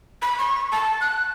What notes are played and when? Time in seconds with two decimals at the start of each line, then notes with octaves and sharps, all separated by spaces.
0.22 B5
0.38 C#6
0.72 A5
1.01 F#6